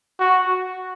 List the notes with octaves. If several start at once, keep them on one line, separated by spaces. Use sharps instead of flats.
F#4